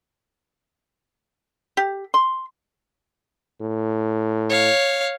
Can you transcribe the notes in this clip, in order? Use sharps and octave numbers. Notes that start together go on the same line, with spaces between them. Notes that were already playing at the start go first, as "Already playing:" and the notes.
G4
C6
A2
C#5 F5